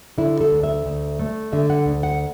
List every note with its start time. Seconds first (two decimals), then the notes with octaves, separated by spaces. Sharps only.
0.18 D3 E4
0.41 A4
0.52 D2
0.63 E5
0.86 D2
1.19 A3
1.53 D3 E5
1.70 F#5
1.86 D2
2.03 F#5